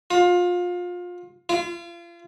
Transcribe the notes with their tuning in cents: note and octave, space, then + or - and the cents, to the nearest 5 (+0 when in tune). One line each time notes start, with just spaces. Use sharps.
F4 +25
F4 -35